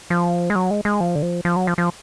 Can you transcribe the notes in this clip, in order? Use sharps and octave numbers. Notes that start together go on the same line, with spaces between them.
F3
G#3
F#3
G#3
G#3
F3
D3
F3
F3
F#3
F3
F3